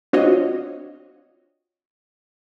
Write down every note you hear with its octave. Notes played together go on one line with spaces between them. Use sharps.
C4 D4 F4 F#4 C#5 D#5